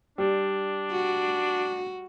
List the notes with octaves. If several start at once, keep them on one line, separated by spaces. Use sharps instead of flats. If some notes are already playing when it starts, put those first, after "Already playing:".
G3 D4
F#4